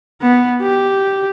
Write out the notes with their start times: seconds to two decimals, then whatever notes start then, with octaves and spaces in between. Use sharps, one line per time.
0.21 B3
0.62 G4